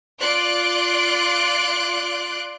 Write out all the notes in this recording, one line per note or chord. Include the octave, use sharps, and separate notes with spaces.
F4 D5 C6 F#6 D7